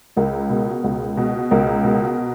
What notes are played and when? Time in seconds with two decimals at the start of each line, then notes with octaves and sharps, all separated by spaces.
0.16 C#2 A#4
0.50 B2
0.84 C#2
1.17 B2
1.51 C#2 A#4
1.84 B2